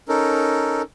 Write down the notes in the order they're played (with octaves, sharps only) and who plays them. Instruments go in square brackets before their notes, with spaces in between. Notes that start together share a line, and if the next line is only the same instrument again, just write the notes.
[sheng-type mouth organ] C#4 D#4 A4 A#4